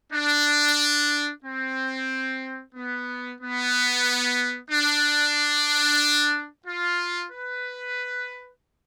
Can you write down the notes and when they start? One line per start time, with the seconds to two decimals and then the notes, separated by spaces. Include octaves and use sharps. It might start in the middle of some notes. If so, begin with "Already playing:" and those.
0.13 D4
1.45 C4
2.75 B3
3.41 B3
4.71 D4
6.67 F4
7.32 B4